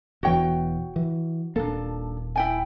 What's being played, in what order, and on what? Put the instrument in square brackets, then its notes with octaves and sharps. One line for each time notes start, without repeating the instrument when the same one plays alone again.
[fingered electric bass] E1 B2 E3 [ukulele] F#4 C#5 G5
[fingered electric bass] E3
[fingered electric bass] D#1 A#3 [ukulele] D4 A4
[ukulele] E4 G5 G#5